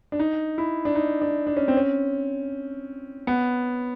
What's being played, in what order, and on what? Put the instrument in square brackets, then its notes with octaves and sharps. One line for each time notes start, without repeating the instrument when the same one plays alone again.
[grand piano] D4
D#4
E4
D4
D#4
D4
D4
C#4
C4
C#4
B3